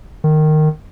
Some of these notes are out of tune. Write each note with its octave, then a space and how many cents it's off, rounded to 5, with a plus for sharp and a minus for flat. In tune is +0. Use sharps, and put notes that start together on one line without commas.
D#3 -15